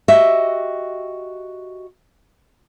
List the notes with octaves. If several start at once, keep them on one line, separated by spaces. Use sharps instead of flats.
F#4 G4 D#5 E5